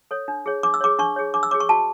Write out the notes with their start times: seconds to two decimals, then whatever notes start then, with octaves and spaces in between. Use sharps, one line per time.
0.11 A4 C#5
0.28 D4
0.46 G#4 C#5
0.63 D4 D6
0.74 E6
0.81 G#4 C#5 D6
0.99 D4 C#6
1.16 G#4 C#5
1.34 D4 D6
1.43 E6
1.51 G#4 C#5 D6
1.60 C#6
1.69 F#4 A5